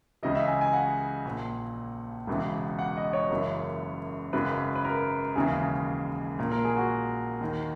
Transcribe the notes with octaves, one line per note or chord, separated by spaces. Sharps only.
C#2 C#3 E3 D#5
E5
G#5
G#5
F#5
A#1 A#2
E1 E2 C#3 E3
F#5
D#5
C#5
F#1 F#2 C#3 E3
G#1 F#2 C#3 B4
B4
A#4
E1 D#2 C#3 E3 G#4
A#1 A#2 A#4
A#4
G#4
F#4
D#2 D#3